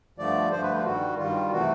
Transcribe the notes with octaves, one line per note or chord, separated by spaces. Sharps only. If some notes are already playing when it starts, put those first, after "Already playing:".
G2 D3 F3 A3 D5
G2 D3 F3 A3 C5
B4
F4
G2 D#3 G3 F#4
G2 D#3 G3 F4
C3 E3 A3 F#4